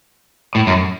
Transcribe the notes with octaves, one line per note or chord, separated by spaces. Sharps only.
A2
F#2